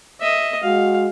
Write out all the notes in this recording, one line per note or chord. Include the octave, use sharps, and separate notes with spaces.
D#5 E5
G#3 F#4 F5